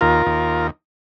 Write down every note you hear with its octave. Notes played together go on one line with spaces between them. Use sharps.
D#2 F4 A#4
D#2